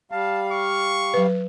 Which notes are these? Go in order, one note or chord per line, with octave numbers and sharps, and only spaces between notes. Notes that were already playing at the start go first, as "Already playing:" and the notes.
G3 F5 A5
C#6
F#3 B4